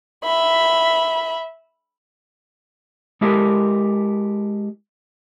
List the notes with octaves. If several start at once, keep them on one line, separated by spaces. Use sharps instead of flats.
E5 B5
G#3 E4 G4 A4 A#4 E5